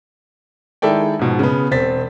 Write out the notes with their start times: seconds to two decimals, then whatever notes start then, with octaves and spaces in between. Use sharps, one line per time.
0.82 D#3 G#3 E4 A4 D5 G5
1.19 G#2 B2 F3
1.39 C#3 B3
1.71 E1 C4 A6 B6